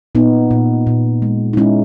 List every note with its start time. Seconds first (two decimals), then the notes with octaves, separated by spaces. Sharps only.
0.15 A#2 B3 D#4
0.51 A#2
0.87 A#2
1.22 G#3
1.53 D#4
1.57 G#3 C#4 E4